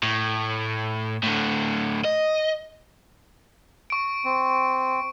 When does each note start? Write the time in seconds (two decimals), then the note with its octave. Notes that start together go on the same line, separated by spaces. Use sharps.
0.03 A2
1.23 A2 D3
2.05 D#5
3.90 C#6 D7
4.25 C4